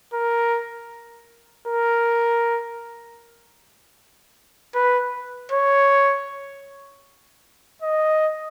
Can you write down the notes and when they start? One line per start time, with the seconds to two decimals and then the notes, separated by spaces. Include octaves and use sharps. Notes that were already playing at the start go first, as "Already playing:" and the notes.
0.13 A#4
1.68 A#4
4.75 B4
5.52 C#5
7.82 D#5